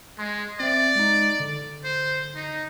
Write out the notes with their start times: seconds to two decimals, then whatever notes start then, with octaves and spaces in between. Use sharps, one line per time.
0.19 G#3 C6
0.60 C4 D5 E5
0.95 G#3 D#4
1.40 D3
1.84 C5
2.36 D#4